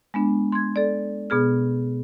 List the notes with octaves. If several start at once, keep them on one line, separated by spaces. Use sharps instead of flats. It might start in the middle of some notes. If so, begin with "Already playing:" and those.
G#3 B3 D4
C6 G#6
A4 D5
B2 B3 G#4 F6